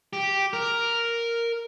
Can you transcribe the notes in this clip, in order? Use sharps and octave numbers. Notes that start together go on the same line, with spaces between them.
G4
A#4